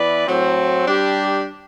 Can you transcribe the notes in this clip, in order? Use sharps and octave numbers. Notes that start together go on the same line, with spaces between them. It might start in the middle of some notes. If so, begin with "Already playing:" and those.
Already playing: E3 B3 E4 B4 D5
A2 F#3 C4
G3 D4 G4